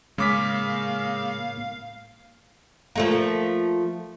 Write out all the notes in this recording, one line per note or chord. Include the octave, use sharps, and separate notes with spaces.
A2 C#3 G#3 A#3 F5 D6 B6
F3 A3 A#3